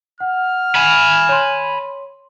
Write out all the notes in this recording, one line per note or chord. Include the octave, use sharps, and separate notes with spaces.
F#5 F6
G#5 B5
C#5 C6